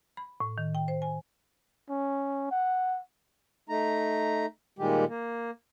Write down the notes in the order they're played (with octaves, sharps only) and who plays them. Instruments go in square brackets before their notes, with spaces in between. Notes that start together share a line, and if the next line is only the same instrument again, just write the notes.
[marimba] B5
A2
D#3
G5
C5
G#5
[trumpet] C#4
F#5
[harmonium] A3 D#4 A#5
A#2 D#3 G3 G#3 G4
A#3